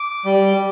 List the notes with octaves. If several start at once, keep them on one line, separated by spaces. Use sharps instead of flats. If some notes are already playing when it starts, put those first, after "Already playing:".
Already playing: D6
G3